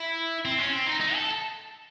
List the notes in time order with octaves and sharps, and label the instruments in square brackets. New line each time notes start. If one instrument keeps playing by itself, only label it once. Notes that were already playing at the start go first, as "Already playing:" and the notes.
Already playing: [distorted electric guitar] E4
C4
C#4
C4
D#4
D#4
A4